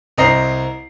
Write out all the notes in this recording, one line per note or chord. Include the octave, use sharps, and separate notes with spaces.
C2 C4 D#5 A#5 C7